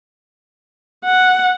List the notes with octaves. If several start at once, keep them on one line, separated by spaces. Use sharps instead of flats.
F#5